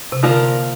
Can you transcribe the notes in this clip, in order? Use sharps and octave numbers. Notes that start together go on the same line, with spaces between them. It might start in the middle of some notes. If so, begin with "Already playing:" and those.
C3
D3 F3 A#3 F4 A#4